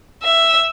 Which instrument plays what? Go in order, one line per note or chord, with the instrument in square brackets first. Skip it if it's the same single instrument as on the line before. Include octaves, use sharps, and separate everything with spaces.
[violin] E5